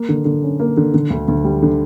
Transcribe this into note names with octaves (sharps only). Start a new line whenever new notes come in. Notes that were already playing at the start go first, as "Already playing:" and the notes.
Already playing: A#3
D3
D3
C#4
A#3
D3
D3
D2
D2
G3
D3